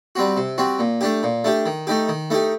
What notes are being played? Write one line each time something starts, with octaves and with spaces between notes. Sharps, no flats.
G3 C4 F#4
C3
G3 C4 F#4
A#2
A3 D4 G4
A#2
A3 D4 G4
D#3
A3 D#4 G4
D#3
A3 D#4 G4